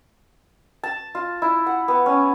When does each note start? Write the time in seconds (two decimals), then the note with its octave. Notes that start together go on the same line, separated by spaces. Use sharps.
0.83 A5
1.15 F4
1.42 E4
1.66 F#5
1.88 B3
2.06 C#4